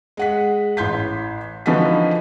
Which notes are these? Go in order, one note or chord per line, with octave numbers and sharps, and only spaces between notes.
G#3 F#5 B6
A1 C6 G6 B6
D3 E3 F3 D#4 F#4 B6